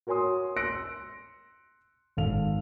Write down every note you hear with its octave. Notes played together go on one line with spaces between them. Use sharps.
F#4 A#4 C#5 G#5 C6 D#6
C6 E6 F#6 A#6 C#7 D7
G#1 A4 F5 F7